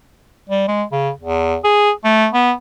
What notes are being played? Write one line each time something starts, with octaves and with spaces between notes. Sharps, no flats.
G3
G#3
C#3
E2
G#4
A3
B3